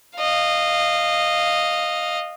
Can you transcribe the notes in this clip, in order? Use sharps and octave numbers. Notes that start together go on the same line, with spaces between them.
D#5 F5